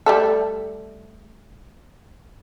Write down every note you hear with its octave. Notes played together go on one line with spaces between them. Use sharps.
G3 A3 A4